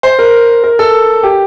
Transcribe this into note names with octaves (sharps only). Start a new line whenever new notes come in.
C5
A#4
A#4
A4
G4